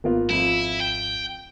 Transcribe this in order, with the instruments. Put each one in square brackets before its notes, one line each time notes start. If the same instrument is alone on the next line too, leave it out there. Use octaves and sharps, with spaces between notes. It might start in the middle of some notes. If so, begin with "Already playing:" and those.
[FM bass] G#1 [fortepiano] A#3 B3 F4
[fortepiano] F2 [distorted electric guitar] E4
[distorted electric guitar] G5